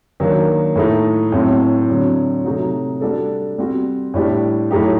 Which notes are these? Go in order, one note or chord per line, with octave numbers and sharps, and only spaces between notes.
D#3 F#3 A#3 D4
A2 A3 D#4
A2 F#3 C4
D3 F#3 C4
C3 F#3 A3 D#4 F#4
G3 D4 F#4 A4
G3 C4 F#4
A2 G3 D4 G4
A2 F#3 A3 D#4 G4